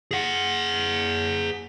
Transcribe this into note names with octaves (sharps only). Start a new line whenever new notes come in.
G#4 F#5